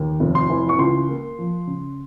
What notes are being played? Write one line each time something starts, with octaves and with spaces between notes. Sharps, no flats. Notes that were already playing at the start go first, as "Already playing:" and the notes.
Already playing: D#2
F1
C6
E3
C#6
C#2 C6
A#3
F3
C#3